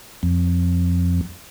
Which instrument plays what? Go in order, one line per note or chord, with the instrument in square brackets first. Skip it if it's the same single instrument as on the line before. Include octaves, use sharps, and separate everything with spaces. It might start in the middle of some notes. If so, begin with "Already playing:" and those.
[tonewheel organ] F2